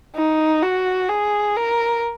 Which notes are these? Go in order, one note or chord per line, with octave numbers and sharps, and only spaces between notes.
D#4
F#4
G#4
A#4